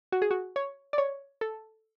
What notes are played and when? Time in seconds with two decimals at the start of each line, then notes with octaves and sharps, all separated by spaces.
0.12 F#4
0.22 G#4
0.31 F#4
0.56 C#5
0.93 D5
0.98 C#5
1.41 A4